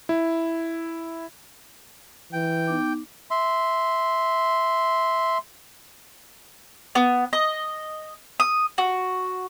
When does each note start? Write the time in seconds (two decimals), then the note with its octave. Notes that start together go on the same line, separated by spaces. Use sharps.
0.09 E4
2.33 E3 G5
2.67 B3 D#4 D6
3.31 E5 C6
6.95 B3
7.33 D#5
8.40 D#6
8.78 F#4